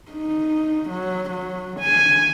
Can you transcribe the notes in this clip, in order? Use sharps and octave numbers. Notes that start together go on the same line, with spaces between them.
D#4
F#3
F#3
G#5